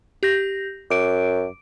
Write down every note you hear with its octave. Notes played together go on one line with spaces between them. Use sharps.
G4 G6 A#6
F#2 D6 D7